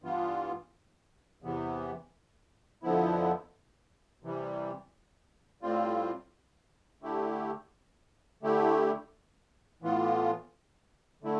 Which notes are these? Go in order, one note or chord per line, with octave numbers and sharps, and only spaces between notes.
G2 E3 B3 F4
E2 C3 E3 B3
F2 D3 F3 B3 E4
C3 E3 G3
A2 G3 C4 F4
D3 A3 E4 G4
D3 A3 E4 G4
A2 E3 B3 F4
D3 A3 E4